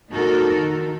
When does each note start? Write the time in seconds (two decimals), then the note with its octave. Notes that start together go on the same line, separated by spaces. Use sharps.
0.11 A#2 D#4 F#4 A4 A#4
0.57 D#3